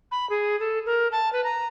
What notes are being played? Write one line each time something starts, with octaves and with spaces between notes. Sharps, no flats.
B5
G#4
A4
A#4
A5
B4
A#5